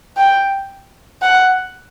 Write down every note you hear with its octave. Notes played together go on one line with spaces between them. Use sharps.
G5
F#5